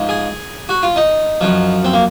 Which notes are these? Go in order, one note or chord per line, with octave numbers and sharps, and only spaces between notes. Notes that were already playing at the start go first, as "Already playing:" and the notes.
Already playing: G#2 F3
G#4
F#4
F4
D#4
F#2 F3
C4
A#3